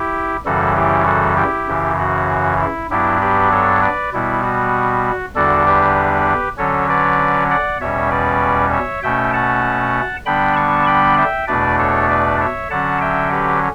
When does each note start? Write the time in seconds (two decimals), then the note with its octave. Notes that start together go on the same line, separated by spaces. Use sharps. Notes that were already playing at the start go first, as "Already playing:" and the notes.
Already playing: E4 G4
0.45 F#2 C#3 E3 G3 F#4 A4
0.76 E4 G4
1.06 F#4 A4
1.37 E4 G4
1.68 F#2 C#3 E3
1.99 F#4
2.60 E4
2.90 G2 F#3 B3 D4 E4 G4
3.21 G4 B4
3.52 A4 C#5
3.82 B4 D5
4.13 B2 G3 B3 E4
4.43 F#4
5.35 E2 D3 G3 D4 F#4 A4
5.66 G4 B4
6.57 D3 F#3 C#4 A4 C#5
6.89 B4 D5
7.50 D5 F#5
7.80 E2 B2 G3 C#4 C#5 E5
8.11 B4 D5
8.72 C#5 E5
9.03 B2 A3 C#4 E5 G5
9.33 F#5 A5
10.26 D3 G3 B3 D4 G5 B5
10.56 A5 C#6
10.86 G5 B5
11.17 E5 G5
11.48 E2 B2 A3 D4 B4 D5
11.79 A4 C#5
12.09 B4 D5
12.40 C#5 E5
12.70 D3 F#3 C#4 F#5 A5
13.01 E5 G5
13.32 G4 B4